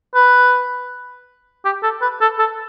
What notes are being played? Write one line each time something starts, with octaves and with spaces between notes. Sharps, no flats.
B4
G4
A4
B4
A4
A4